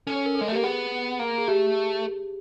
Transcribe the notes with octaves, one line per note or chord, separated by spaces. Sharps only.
C#4 A4
C#5
A#4
A4
G#3
A3
A#3 G4
B3 G#4
A#3
G#4
A3 G4